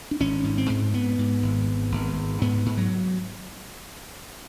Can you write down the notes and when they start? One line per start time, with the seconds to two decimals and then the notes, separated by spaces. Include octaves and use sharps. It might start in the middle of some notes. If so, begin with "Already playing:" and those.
0.11 D4
0.20 G#1 C#4
0.44 G#2
0.58 C4
0.69 G#2
0.94 G#2 B3
1.19 G#2
1.43 G#1
1.68 G#2
1.92 G#1
2.16 G#2
2.41 G#2 B3
2.66 G#2
2.77 F#3